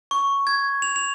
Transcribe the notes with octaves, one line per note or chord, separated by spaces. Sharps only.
C#6
G#6
F7
F7